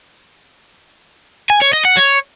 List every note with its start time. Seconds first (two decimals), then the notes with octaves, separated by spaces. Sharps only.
1.50 G#5
1.62 C#5
1.73 D#5
1.85 F#5
1.97 C#5